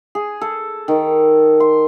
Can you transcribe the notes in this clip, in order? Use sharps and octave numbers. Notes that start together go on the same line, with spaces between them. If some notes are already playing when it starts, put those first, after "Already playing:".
G#4
A4
D#3
C6